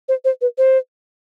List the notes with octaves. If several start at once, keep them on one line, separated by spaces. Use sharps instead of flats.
C5
C5
B4
C5